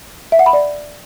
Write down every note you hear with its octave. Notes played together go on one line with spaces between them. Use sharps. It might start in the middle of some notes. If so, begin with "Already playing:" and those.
E5
F#5
B5
D5